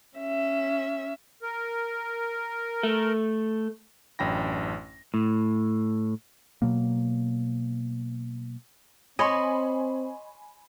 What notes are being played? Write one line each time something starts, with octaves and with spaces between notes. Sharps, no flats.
C#4 E5
A#4
A3
A1 F#2 D4 G5 B5 A#6
A2
B2 F#3 A#3
C4 C#5 D#5 G#5 B5 C6